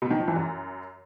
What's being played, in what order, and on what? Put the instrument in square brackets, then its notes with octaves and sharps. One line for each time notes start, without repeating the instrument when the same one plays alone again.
[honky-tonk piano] B2
D#3
F3
E3
F#2